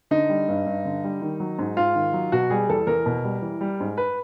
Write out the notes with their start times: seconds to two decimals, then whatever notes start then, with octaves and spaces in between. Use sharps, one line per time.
0.11 D3 D#4
0.29 G3
0.48 G2
0.66 G2
0.85 D3
1.04 G3
1.22 D#3
1.40 F#3
1.59 G#2
1.77 G#2 F4
1.95 D#3
2.13 F#3
2.32 B2 F#4
2.50 G3 G#4
2.69 E2 A4
2.87 E2 A#4
3.06 B2
3.25 G3
3.42 E3
3.61 G3
3.80 G#2
3.97 B4